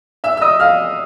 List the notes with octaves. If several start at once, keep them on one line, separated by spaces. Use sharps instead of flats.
E5 E6
E6
D#5 D#6
F5 F6